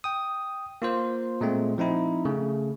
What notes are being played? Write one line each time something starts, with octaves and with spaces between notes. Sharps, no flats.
G5 D#6
A#3 F4 C5
A#2 G#3 A3 C4
F3 C4 D#4 E4
C#3 A3